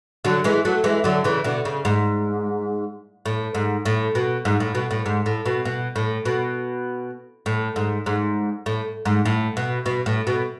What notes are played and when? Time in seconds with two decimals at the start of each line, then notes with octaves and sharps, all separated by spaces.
0.25 D3 F#3
0.44 E3 G#3
0.65 F#3 A3
0.84 E3 G#3
1.04 D3 F#3
1.24 C#3 E3
1.44 B2 D3
1.65 C#3
1.85 G#2
3.26 A2
3.55 G#2
3.85 A2
4.15 B2
4.45 G#2
4.60 A2
4.75 B2
4.91 A2
5.06 G#2
5.26 A2
5.46 B2
5.65 B2
5.96 A2
6.25 B2
7.46 A2
7.76 G#2
8.06 G#2
8.66 A2
9.05 G#2
9.25 A2
9.57 B2
9.86 B2
10.06 A2
10.27 B2